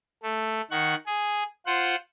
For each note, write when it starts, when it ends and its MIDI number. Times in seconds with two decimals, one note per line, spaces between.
0.23 0.61 57
0.71 0.95 51
0.71 0.95 78
0.71 0.95 85
1.06 1.43 68
1.66 1.96 65
1.66 1.96 72
1.66 1.96 78